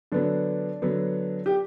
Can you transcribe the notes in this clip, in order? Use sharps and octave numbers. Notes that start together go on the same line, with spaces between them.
D3 F#3 B3 D4
D3 F#3 B3
G4